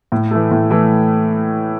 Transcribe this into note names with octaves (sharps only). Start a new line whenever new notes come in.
A2
E3 A3
A2
E3 A3